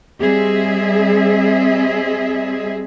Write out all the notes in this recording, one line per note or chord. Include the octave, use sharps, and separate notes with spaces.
G3 C4 G#4 D#5 E5